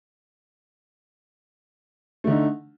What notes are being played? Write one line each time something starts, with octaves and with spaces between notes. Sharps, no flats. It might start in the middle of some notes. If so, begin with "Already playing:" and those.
D3 A3 D#4